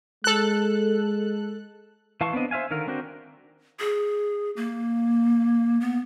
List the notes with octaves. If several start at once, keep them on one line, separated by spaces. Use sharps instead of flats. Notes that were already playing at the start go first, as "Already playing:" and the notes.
G#3 A4 F#6
E3 F5 A5 C6 C#6
B3 C4 D4 D#5
C5 E5 F5 G#5
D3 D#3 A#4 F5
C4 D4 F#4 A#4 G5
G#4
A#3
B3